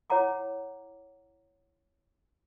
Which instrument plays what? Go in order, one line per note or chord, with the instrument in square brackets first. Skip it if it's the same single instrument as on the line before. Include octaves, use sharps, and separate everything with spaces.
[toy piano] E4 C#5 F#5 A#5 D6